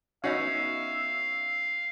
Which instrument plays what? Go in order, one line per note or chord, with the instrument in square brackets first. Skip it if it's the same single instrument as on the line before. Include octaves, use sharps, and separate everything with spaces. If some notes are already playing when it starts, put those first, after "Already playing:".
[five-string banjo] B3 D#4 F#4 [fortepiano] C#4 [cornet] E5 [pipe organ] F5